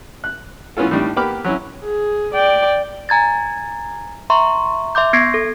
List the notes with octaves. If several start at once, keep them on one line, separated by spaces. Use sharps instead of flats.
F#6
E3 A3 B3 C#4 F4 A4
A2 D#3 G3 D4
A#3 B3 G4 B5 D6 F6
F#3 C#4 E4
G#4
D5 G5
G#5 A#5 G#6 A6
E5 A#5 C6 C#6
E5 C6 D6 G6
B3 G#6 A#6 C7 D7
A4